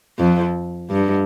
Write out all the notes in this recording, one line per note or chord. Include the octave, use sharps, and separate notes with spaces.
F2
G2